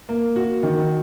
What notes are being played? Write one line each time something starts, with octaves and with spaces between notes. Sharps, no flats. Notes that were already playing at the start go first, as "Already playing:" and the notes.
A#3
F#4
D#3